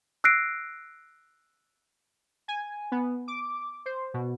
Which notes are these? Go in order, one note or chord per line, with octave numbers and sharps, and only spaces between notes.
E6 F#6 A#6 C7 D7
G#5
B3
D6
C5
B2